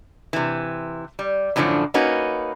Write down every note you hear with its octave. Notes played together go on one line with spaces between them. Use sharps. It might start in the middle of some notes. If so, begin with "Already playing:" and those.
C3 E3
G3
F#2 A2 D3 F3 D4
A#3 C#4 D#4 F#4 B4